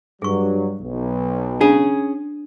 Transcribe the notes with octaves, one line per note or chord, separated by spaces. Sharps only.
G2 F#3 G#4 C#6
B1
C#4 D4 G#4